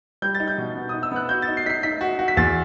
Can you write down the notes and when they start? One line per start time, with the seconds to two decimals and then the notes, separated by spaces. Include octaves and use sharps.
0.22 G3 G6
0.35 A6
0.40 D#4
0.48 G6
0.58 B2
0.75 B3
0.89 D#4 D#6
1.03 E6
1.12 B3 F#6
1.29 F#4 G6
1.42 A6
1.48 D#4
1.57 C7
1.66 D#4 B6
1.70 C7
1.83 D#4 B6
2.01 F#4
2.19 F#4
2.28 B6
2.37 E2 A6